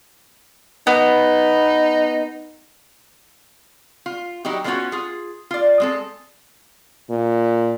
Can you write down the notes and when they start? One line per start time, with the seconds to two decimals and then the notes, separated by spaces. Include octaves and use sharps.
0.87 B3 D#4
4.06 F4
4.45 F#3 D#4 E4 G4
4.64 F3 G#3 B3 C#4 F4 F#4
4.92 F4 G#4
5.51 F4 D5
5.80 G#3 C4 A4
7.10 A#2